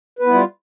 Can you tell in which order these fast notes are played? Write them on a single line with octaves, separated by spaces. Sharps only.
B4 B3 E4 G3 F4